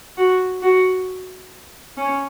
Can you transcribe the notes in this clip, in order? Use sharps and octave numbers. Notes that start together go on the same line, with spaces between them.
F#4
F#4
C#4